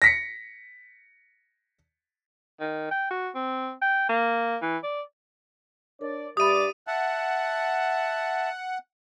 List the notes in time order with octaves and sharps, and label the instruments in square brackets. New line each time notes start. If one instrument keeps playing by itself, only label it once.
[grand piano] A#6 B6 C#7
[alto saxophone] D#3
G5
F#4
C4
G5
A#3
E3
D5
[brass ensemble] D4 C#5 D5 [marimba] A#4
[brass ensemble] G2 D5 [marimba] G4 E5 B5 [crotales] D#6 D#7
[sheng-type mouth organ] E5 A5 [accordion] F#5